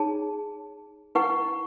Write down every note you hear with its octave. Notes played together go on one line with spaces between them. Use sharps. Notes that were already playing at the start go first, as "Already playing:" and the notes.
Already playing: D#4 G#4 C#5 A5
E4 B4 F#5 C#6